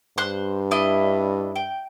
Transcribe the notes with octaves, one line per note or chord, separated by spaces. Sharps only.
G2 C5 C6 F#6
D4 E4 D#5
G5